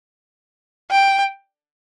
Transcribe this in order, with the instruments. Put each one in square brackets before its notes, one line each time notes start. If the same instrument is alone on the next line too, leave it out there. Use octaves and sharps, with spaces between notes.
[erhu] G5